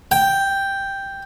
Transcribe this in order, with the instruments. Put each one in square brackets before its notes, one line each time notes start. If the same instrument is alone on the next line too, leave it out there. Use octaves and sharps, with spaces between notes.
[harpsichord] G5